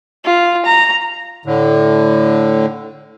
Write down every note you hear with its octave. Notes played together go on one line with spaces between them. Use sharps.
F4
A#5
A2 D3